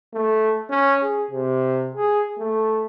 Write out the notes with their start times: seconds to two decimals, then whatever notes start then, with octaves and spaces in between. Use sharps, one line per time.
0.13 A3
0.70 C#4
1.02 G#4
1.31 C3
1.95 G#4
2.38 A3